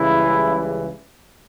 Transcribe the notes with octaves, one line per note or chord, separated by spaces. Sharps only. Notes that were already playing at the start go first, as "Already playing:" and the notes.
Already playing: C#2 C#3 E3 G3 E4